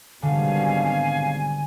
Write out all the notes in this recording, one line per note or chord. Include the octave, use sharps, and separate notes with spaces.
G#1 B2 D3 G3 F5 G#5